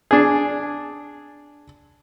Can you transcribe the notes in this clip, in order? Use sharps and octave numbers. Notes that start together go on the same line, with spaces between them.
D4 G#4